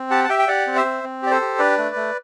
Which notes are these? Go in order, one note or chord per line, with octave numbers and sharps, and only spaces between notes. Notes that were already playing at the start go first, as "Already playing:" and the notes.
Already playing: C4
G4 F#5 A5
A5
G4 E5 G5
G5
G4 D5 F#5
C4
C5 E5
C4
C4
G4 D5
A4 C5
G4
D4 B4 D5
A3
A3